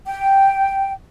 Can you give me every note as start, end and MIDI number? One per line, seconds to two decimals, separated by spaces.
0.07 0.92 79